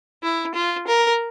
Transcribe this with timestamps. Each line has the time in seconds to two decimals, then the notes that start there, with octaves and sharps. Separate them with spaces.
0.23 E4
0.54 F4
0.87 A#4